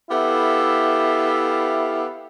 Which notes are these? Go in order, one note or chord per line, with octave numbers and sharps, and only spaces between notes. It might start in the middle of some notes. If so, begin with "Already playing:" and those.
B3 E4 G4 A4 E5 F5